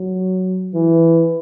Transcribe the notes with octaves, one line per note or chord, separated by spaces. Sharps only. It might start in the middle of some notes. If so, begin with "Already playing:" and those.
Already playing: F#3
E3